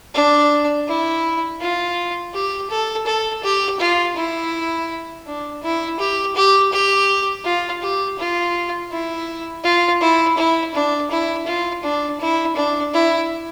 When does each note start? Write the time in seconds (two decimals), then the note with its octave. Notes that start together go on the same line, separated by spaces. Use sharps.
0.14 D4
0.87 E4
1.61 F4
2.34 G4
2.70 A4
3.06 A4
3.43 G4
3.80 F4
4.16 E4
5.26 D4
5.62 E4
5.99 G4
6.35 G4
6.73 G4
7.45 F4
7.82 G4
8.19 F4
8.92 E4
9.64 F4
10.01 E4
10.37 E4
10.74 D4
11.10 E4
11.46 F4
11.83 D4
12.20 E4
12.56 D4
12.93 E4